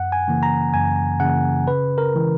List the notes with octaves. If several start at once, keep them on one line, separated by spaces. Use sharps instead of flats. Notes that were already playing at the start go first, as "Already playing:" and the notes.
Already playing: F#2 F#5
G#5
C#3 E3 A#3
A#5
F#2 G#5
C#3 E3 A#3 F#5
C#3 B4
A#4
E3 G#3